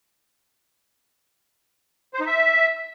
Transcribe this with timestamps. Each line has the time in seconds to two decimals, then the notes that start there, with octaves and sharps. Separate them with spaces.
2.14 C5
2.20 D#4
2.27 E5